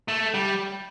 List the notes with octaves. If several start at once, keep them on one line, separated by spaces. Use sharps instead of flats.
A3
G3